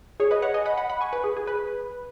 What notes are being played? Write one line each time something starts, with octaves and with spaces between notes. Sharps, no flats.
G#4 C#5
B4 D#5
C#5 F#5
D#5 G#5
F#5 B5
F#5 B5
F#5 B5
G#5 C#6
B4
G#4
G#4
B4